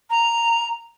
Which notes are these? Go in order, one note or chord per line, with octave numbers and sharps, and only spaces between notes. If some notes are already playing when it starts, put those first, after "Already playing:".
A#5